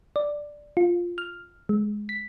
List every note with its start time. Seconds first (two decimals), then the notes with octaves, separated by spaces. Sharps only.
0.16 D5
0.77 F4
1.18 F6
1.69 G#3
2.09 B6